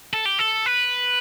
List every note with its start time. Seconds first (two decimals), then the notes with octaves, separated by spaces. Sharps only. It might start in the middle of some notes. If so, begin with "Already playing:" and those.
0.13 A4
0.25 G4
0.39 A4
0.66 B4